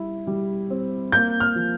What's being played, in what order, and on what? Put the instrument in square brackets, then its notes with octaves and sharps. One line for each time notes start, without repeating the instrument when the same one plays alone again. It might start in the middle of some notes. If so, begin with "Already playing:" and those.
Already playing: [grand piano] G3 E4
G3
C4
[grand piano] A#3 [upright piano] G6
[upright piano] F6
[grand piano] F3